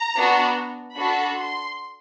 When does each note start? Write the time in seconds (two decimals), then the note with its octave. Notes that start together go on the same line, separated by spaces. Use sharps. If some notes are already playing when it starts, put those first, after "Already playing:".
Already playing: A#5
0.15 B3 D4 F#4
0.95 D4 F#4 A4 B5
1.36 C6